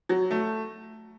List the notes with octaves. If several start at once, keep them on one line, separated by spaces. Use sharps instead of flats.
F#3
A3